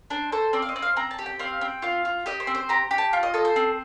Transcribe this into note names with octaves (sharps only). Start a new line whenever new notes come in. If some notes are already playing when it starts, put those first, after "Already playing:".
D4 C5
A4 C5
C4 D5
F5
D#5
C4
F5
C4 A#5
A5
G4
G5
C4 F5
C4 G5
F4 F5
F4
G4 D#5
C5
C4
C5
G4 A#5
G4
A5
F4
D#5
A4 D#5
C5
C4